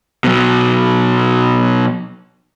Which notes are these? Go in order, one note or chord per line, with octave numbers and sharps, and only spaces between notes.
B2 F#3